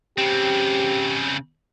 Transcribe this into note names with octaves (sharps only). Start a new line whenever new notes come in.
C#3 C4 G4